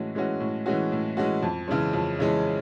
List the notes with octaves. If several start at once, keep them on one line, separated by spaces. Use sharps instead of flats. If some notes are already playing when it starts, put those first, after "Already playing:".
Already playing: A2 E3 G#3 C#4 F#4
E3 G#3 C#4 F#4
A2
E3 G#3 C#4 F#4
A2
E3 G#3 C#4 F#4
F2
C#3 E3 G#3 C#4
F2
C#3 E3 G#3 C#4